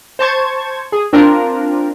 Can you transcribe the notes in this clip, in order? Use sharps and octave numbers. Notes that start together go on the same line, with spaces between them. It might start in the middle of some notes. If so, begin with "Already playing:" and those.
C5 A5 C#6 G#6
G#4
C4 D4 F4 A#4